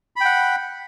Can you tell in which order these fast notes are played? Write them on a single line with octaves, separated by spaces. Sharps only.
B5 G5 F#5